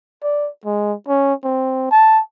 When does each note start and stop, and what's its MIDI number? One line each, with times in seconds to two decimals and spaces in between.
0.23 0.49 74
0.65 0.94 56
1.08 1.33 61
1.44 1.87 60
1.91 2.20 81